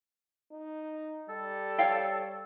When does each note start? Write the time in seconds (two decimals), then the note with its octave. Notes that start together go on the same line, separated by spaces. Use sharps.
0.52 D#4
1.29 G3 A4
1.78 C#5 F5 G5